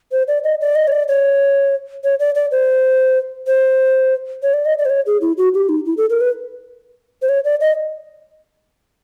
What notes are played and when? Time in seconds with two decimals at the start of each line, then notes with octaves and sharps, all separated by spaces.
0.12 C5
0.28 D5
0.44 D#5
0.61 D5
0.75 D#5
0.87 C#5
0.92 D5
1.08 C#5
2.04 C#5
2.20 D5
2.35 D5
2.52 C5
3.47 C5
4.43 C#5
4.54 D5
4.66 D#5
4.79 D5
4.85 C5
4.90 C#5
5.06 G#4
5.21 E4
5.38 F#4
5.54 G4
5.69 D#4
5.85 E4
5.97 A4
6.10 A#4
6.21 B4
7.22 C5
7.29 C#5
7.45 D5
7.61 D#5